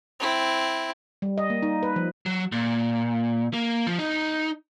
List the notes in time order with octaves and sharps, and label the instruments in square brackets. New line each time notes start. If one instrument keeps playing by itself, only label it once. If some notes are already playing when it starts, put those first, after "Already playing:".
[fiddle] C4 E4
[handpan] G3
D#5
A#3
D#4
B4
F3
[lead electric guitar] F#3
A#2
A#3
F3
D#4